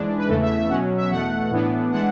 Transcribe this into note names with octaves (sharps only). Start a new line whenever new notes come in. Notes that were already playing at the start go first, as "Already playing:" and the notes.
Already playing: G#2 E3 G#3 D4
B4
E2 C#3 E3 A3 A4
E5
E5
B2 F#3 C#4 F#5
E5
E2 B2 A3 F#5
A2 E3 B3 D4
E3 G#3 D4 F#5